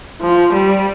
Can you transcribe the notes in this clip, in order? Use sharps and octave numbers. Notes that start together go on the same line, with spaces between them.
F3
G3